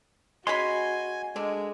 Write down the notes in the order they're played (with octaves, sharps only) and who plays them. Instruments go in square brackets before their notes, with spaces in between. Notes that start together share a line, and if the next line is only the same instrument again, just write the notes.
[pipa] G#3 C#4 B5 [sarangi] F#4 [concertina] G#5 [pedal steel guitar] C6
[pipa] D3 [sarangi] G#3